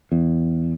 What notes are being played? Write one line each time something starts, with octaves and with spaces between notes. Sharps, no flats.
E2